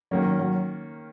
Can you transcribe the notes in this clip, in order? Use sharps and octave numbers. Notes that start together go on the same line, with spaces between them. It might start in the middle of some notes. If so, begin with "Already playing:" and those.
D#3 F#3 A#3 C#4
F#3
F#3